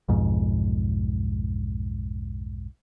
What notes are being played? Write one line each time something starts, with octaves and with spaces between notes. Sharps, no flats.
B1 F2 G#2